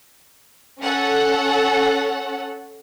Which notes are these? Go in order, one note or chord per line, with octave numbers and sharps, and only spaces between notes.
C#4 A4 F#5